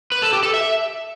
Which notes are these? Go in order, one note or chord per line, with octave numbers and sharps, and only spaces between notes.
B4
A4
G4
A4
E5